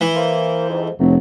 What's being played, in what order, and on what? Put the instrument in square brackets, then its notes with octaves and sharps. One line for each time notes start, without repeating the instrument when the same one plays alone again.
[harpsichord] E3
[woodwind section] A#3 C5
F2 G#2
[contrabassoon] F1 [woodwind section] A2 F#3